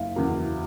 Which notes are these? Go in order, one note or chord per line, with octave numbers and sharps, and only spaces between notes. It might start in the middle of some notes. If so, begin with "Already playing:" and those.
Already playing: F#1 E5 F5
E2 C#3 F#3 A#3